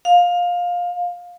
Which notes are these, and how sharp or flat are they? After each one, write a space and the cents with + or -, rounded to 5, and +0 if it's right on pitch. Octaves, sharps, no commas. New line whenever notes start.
F5 +15